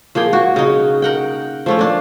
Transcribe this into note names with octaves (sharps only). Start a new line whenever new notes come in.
F3 A#3 G#4 G5
F#4
C#3 D#4
A#4 F#5 G5
F3 A3 C#4
A#3 D4